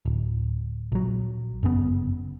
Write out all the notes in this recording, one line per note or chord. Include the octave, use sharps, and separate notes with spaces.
D1
A#1 F#3
G1 F#2 C#3 B3